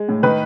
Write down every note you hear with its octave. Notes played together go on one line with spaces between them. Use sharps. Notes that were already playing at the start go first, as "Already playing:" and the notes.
Already playing: G#3
A2
D#3 B4